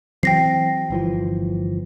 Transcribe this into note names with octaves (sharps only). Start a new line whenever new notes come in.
E3 F#3 C4 G5 A#6 C7
G1 E3 F3